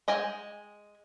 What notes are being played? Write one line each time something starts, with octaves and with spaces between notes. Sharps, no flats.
G#3 D#5 G5 G#5